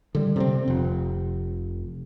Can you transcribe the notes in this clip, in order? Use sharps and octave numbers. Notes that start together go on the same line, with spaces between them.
D3 G3
C3 A#3 C4
F1